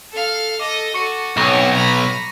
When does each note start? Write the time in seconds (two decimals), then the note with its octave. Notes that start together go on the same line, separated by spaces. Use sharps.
0.12 A4 F5
0.60 A4 D#5 D6
0.94 F#4 A4 C#6 C#7
1.37 B1 C4 C#5 C#6 A#6 E7
1.75 A#5 B5